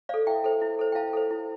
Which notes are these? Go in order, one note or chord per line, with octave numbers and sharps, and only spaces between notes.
A4 C5 D5 F5
E4 E5 G5
A4 C5
E4
A4 C5
G5
E4 F5 A5
A4 C5
E4